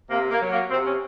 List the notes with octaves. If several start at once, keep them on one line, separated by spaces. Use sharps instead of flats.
C3 A#3
A#3
F#3
A#3
C3 C4
C#4